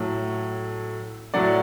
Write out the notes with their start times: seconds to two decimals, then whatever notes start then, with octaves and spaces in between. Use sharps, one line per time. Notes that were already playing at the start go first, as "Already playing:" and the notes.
Already playing: A2 F#3 A3
1.34 A2 F#3 A3 D5 F#5